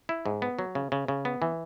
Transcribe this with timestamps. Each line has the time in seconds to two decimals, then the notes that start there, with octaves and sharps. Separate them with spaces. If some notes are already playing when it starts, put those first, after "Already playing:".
0.09 E4
0.26 G#2
0.42 B3
0.59 F#3
0.75 C#3
0.92 C#3
1.08 C#3
1.25 B3
1.42 E3